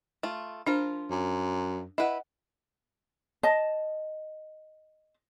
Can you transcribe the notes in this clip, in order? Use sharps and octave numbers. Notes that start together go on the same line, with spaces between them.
A3 F4
F3 D4 F4 A#4
F#2
E4 B4 D#5 F#5
D#5 A5